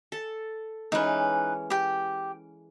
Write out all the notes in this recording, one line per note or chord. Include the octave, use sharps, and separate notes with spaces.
A4
E3 G#3 C#4 D#4 B4
G4 G5